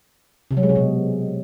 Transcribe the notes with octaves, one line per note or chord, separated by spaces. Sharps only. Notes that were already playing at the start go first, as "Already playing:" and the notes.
C3
F#3
G#3
C3
B2